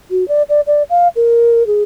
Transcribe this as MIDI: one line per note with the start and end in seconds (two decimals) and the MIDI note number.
0.11 0.27 66
0.28 0.43 74
0.49 0.61 74
0.67 0.83 74
0.90 1.08 77
1.16 1.66 70
1.67 1.83 68